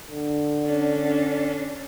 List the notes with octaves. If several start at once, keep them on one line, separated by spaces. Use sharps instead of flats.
D3
C#4 D4